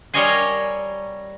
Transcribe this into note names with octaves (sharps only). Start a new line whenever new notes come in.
G3 A#4 C#5 D#5 G#5 C6